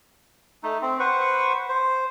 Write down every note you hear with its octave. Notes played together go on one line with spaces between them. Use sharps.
A3 D#4
C4
B4 C5 F#5 C#6
C5